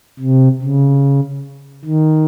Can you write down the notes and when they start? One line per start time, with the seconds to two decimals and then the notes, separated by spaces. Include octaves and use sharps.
0.20 C3
0.62 C#3
1.85 D#3